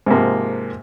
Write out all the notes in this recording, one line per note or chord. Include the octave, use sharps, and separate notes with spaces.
G#2 C3 F3 A#3